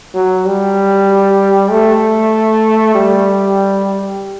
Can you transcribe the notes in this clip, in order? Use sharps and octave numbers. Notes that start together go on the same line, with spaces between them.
F#3
G3
A3
G3